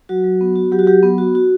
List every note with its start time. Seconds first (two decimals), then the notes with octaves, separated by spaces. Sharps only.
0.09 F#3 F#4
0.24 F#3
0.41 B3
0.56 F#4
0.72 F#3 G4
0.79 F#4
0.87 F#3 G4
1.03 B3
1.18 F#4
1.35 F#4